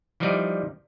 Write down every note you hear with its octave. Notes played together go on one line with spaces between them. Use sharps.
E3 F3 G3 D#4 D5